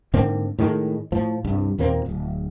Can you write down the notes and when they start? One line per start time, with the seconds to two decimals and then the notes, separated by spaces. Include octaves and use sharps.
0.14 G#2 D3 A#3 C4
0.59 A2 D#3 G#3
1.12 A2 F3
1.44 C2 G2
1.78 D#2 A#2 A#3 C4
2.06 D1